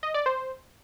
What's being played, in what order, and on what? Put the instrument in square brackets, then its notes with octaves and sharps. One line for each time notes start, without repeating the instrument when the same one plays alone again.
[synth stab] D#5
D5
C5